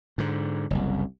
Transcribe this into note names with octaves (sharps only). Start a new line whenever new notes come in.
G#2 D3
F#1 C2